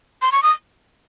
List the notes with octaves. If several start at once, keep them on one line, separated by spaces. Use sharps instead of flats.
C6
C#6
D#6